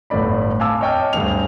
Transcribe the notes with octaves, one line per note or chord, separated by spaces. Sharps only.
G1 A2 A3 D5 B5
F5 G#5 A5 D6 E6
C#5 D#5 G5 A5 F6
D2 G2 G#4 F7